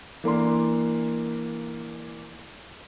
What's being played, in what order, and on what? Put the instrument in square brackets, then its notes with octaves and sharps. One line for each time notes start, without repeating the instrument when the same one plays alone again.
[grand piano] E3 A#3 D4 C6